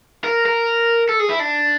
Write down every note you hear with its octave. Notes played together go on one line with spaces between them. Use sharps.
A#4
A#4
A4
G#4
E4
D4